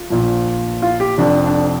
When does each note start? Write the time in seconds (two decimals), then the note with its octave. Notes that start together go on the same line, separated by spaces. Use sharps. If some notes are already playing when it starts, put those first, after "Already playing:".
Already playing: F4
0.10 A#1 A#2 F3
0.82 F4
1.00 G4
1.18 F1 F2 F3 D4
1.46 D4